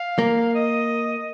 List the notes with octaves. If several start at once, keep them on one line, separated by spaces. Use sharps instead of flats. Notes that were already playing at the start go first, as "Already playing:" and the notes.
Already playing: F5
A#3
D#5